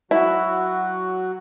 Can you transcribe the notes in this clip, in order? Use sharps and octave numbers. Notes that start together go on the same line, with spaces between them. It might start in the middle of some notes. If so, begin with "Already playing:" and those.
F#3 E4 F#4